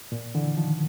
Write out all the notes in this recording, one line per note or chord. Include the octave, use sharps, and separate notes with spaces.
A#2
D3 E3
D#3 F3